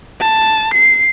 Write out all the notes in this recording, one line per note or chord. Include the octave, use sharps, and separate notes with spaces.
A5
C7